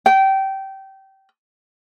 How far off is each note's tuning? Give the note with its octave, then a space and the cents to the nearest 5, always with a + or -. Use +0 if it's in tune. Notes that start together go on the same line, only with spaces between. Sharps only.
G5 -20